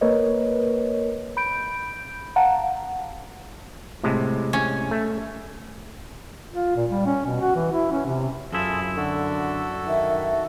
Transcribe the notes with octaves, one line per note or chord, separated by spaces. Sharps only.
A#3 A#4 B4 C#5 D#5
B5 G6 D7
F5 F#5 A5 A#5
A2 C3 G#3
C#4
A3
F4
A#2
G3
C#4
B2
F#4
E3
E4
C#4
C3
F#2 E4 F4 G#4 A4
D3 F#4 A4
D#3 E5